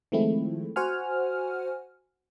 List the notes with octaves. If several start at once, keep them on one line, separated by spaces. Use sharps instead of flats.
D#3 F3 G#3 A3 C4 E4
F#4 C5 F#5 G#5 F6